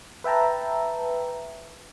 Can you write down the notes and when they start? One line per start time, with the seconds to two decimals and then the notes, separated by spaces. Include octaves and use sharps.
0.24 B4 E5 G5 A5 A#5